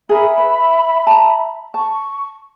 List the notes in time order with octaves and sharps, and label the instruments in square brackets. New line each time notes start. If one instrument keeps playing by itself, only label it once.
[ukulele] G#4 A#4 [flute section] E5 B5
[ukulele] B4
A5 A#5
[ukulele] A5 [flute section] C#6